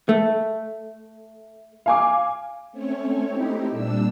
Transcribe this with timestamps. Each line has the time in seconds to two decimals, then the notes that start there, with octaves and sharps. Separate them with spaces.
0.09 A3
1.86 F5 G#5 D6
2.72 A3 C4 C#4 C#5
3.29 A3 C4 D#4 E4 G4
3.71 A#2 G3 D4 E6